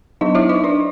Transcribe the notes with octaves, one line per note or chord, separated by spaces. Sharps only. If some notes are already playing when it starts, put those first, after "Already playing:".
F#3 B3 D4 D#4 D#5
E4 E5
D#4 D#5
D4 D5